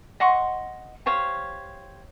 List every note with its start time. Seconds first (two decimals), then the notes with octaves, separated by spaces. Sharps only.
0.20 D#5 F#5 C6 C#6
1.06 G4 C5 C#5 F5